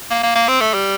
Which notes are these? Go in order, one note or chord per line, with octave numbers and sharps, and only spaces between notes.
A#3
A#3
A#3
C4
A3
G3